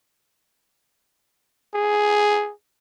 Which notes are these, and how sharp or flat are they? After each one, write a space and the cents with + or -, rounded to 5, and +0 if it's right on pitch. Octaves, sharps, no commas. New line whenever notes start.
G#4 +5